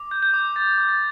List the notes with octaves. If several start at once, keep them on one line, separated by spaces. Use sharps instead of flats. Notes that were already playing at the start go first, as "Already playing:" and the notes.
Already playing: D6
G6
G6
D6
D6 A6
D6
A6